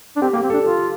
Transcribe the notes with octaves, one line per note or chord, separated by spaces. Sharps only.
D4
C4 G4
A#3
G4
C4
D4 A4
F4 A4